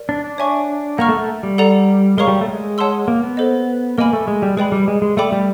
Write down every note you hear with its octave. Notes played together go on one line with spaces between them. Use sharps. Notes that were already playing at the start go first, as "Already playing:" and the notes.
Already playing: A#4 D5
D4
D4
C#5 E5 G#5 C#6
A#3 F#5 A#5 C#6 F6
A3
A3
G3
A4 D5 F#5 A#5
G#3 A#4 C#5 F5 A#5 C#6
G3
A3
G#3
C#5 F#5 A5 C6 E6
A#3
B3
A4 C5 D#5
A#3 A#4 D#5 G#5 B5
A3
G#3
G3
G#3 B4 D5 G5 B5
G3
G#3
G#3
A3 D5 G5 B5 D6
G3